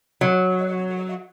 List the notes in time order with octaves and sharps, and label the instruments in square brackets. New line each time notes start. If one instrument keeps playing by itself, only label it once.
[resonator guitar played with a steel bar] F#3